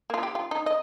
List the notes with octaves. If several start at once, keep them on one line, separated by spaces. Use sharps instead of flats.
A#3 F4
G4
F4
D#4
D#5